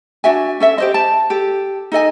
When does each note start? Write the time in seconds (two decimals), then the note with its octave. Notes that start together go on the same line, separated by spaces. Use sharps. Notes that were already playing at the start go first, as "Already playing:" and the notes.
0.24 D4 F#4 E5 G#5
0.60 C#4 A4 E5
0.78 G4 C5 D#5
0.94 A5
1.30 G4 A4
1.92 D#4 A4 D#5 G#5